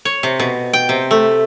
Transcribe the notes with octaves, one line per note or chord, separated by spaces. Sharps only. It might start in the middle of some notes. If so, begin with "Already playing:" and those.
C#5
C3
B2
G5
C3
A3